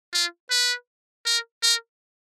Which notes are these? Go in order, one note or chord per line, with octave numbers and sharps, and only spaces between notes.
F4
B4
A#4
A#4